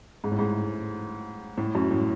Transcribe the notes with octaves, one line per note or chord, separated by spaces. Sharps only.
G#2
A2
G#2
A2
F#2
A2